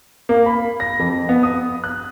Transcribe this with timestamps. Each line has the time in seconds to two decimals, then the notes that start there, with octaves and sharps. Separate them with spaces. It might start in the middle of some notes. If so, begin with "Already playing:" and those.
0.29 A#3
0.46 B5
0.80 A#6
1.00 F2
1.29 B3
1.43 D#6
1.84 F#6